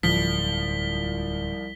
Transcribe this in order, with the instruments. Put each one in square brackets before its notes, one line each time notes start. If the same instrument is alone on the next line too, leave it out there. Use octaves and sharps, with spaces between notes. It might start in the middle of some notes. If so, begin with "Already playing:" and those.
[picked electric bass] D1 [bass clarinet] C2 [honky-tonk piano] F3 [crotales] B6 G7